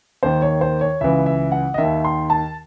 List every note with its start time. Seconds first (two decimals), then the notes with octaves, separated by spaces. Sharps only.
0.23 D#2 D#3 C5
0.42 C#5
0.61 C5
0.81 C#5
1.01 C#2 C#3 E3 E5
1.26 E5
1.52 F#5
1.74 D#5
1.78 D#2 D#3 E5
2.05 C6
2.30 A5